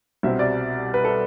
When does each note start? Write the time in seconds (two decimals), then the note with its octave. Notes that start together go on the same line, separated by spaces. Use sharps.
0.23 C2 B2 G3 C4 E5
0.39 D5
0.94 B4
1.05 A4